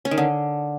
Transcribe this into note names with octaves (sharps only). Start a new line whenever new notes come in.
C#4
D#3
D3